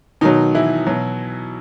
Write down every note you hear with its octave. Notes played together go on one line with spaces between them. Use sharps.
B2 D#3 F#3 D#4
E3 E4
B2 F#3